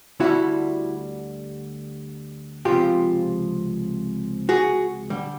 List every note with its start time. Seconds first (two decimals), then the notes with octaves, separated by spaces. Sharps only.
0.20 D2 D3 G3 E4 F#4
2.65 C#2 C3 F3 F4 G4
4.49 F#4 G#4
5.10 D3 G3